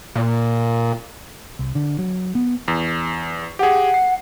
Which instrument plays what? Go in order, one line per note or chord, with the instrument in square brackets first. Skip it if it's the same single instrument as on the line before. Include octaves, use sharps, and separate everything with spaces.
[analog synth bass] A#2
[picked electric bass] C2
D3
F#3
B3
[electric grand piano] E2
[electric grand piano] G4 G#4 [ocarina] F#5
[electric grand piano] C7